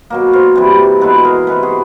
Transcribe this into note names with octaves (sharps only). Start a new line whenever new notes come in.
B2 F#3 A#3
A#4 C5
C3 E3 G3
B2 G#3 B3 A4 B4
G#4 A#4
C3 E3 G#3 B3 A4 B4
F#4 G#4